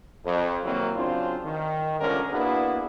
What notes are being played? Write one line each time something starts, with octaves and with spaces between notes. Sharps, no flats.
F2
C3 D#3 F#3 A#3 C4 E4
C#3 F#3 C4 D4 F4
D#3
C#2 G2 D3 F3 C#4 A#4
A#3 B3 D4 E4 F#4 G#4